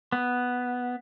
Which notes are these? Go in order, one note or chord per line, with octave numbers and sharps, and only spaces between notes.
B3